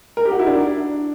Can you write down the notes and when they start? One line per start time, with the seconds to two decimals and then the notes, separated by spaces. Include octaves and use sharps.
0.17 A#4
0.25 G4
0.32 F#4
0.39 E4
0.47 D4